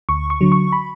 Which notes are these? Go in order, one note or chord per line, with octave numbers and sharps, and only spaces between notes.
D2 C#6
C#6
D3 F#3
C#6
B5